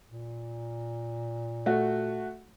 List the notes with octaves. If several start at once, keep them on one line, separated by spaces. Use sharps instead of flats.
A#2
A3 F#4